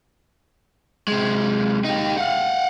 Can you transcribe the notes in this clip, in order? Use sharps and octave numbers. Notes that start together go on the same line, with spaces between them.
C3 G#3
D#4 G4
F5 F#5